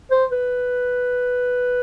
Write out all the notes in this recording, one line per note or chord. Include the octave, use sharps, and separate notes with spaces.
C5
B4